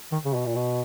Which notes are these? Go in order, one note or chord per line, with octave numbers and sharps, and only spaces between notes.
D#3
C#3
B2
A#2
B2